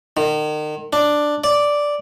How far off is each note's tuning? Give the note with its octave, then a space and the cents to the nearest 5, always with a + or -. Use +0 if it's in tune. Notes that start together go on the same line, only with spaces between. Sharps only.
D#3 -35
D4 +5
D5 -5